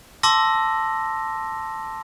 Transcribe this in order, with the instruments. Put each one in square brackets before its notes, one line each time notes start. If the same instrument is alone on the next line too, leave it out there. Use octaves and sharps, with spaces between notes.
[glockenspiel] A5 C6 D6 E6 A#6